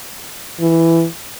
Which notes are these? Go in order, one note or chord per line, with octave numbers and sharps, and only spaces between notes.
E3